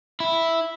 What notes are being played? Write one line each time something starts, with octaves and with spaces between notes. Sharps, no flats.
E4